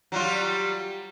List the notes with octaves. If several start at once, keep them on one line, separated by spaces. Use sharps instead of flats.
F#3 G3 F4